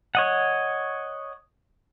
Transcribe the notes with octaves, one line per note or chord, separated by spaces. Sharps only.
C#5 D#5 F#5